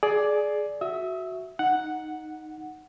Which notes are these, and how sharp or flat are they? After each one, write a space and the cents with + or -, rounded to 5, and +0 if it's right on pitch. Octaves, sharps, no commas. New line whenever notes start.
G#4 +20 D5 +0
F#4 +0 E5 +0 D#6 +35
D#4 +0 F#5 +0